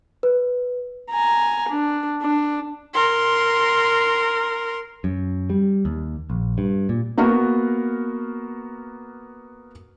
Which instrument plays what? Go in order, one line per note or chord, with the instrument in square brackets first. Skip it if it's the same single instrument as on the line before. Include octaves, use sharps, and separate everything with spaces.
[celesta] B4
[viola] G#5 A#5
D4
D4
[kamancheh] A#4 C6
[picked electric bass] F#2
G3
D#2
A#1
G2
A#2
[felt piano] A#3 B3 F#4 A#4